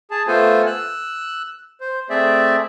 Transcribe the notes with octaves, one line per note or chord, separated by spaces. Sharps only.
G#4 A5
A3 B3 F4 A4 C5 G#5
E6 F#6
C5
A3 C4 G#4 D5 E5